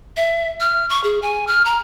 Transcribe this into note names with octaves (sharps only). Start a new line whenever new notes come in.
E5
F6
C#6
G#4
G#5
F6
A#5